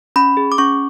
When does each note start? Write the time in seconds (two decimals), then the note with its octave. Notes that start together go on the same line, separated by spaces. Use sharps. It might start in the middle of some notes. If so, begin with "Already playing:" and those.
0.16 C#4 B5
0.37 G#4
0.52 D6
0.58 C#4 C#6